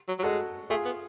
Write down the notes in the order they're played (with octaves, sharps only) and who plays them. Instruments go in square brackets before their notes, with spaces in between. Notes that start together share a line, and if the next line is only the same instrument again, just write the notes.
[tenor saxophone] F#3
F#3
[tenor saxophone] G#3 [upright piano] F#4 A4
[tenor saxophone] A3 [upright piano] F4 G#4
[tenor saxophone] B3